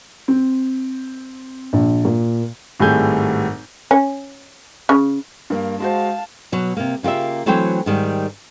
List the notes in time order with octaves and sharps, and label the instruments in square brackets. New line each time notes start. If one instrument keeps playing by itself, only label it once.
[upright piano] C4
A#1
A#2
[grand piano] G#1 A2 G3 G#4 G#5 G6
[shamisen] C#4
C#3
[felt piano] G2 A#3 F5
[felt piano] G#3 F#4 C5 [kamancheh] F5 A5
[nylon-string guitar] B2 F#3
C3 A#3
C#3 A#3 F4 G4 E5
E3 F#3 A3 C4 C5 G5
G#2 D#3 G3